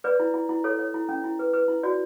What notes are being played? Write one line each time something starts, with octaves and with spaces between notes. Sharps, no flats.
B4 D5
E4
E4
E4
A4 C#5
C#5
E4
C#4
E4
B4
B4
E4
F#4 D5